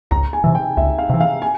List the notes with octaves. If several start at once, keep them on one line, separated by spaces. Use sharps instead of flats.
C#2 A#5
G#5
C3 E3
G5
C#2 E5
F5
C3 E3
F5
G#5